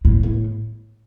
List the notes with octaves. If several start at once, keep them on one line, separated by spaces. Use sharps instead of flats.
A2
A2